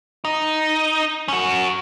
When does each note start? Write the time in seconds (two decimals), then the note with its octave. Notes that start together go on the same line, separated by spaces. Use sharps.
0.25 D#4
1.28 C#4 F#4